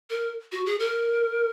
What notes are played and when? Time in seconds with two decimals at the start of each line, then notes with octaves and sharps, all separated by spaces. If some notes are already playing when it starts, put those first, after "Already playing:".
0.10 A#4
0.52 F#4
0.66 G#4
0.80 A#4